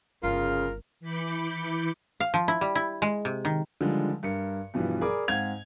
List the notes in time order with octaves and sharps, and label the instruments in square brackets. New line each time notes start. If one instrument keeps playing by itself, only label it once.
[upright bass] G1 G2 [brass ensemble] C#3 [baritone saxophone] F4 [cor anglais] A#4
[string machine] E3 B5 D6 G6 C#7
[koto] F5
F3
E4
G3
E4
G#3
C3
D#3
[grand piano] D3 D#3 F3 G3 G#3
G2 A#4 C#7
G2 B2 E3 F3 G3
G#4 A#4 D5 B5 D6
G#2 C4 F5 F#5 G#6 F7